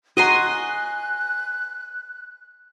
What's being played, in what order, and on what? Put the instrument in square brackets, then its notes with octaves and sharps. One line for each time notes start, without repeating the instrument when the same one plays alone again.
[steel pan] F#4 A#5 [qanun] D#5 G#5 C6 [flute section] F#6